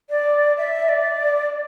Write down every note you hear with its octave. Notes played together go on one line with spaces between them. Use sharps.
D5
E5
D5